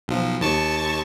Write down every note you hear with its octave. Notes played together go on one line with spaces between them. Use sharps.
B1 F3
D#2 A5 C#6